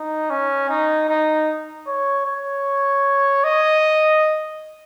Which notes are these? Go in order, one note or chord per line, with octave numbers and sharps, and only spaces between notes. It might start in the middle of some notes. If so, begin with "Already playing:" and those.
Already playing: D#4
C#4
D#4
D#4
C#5
C#5
D#5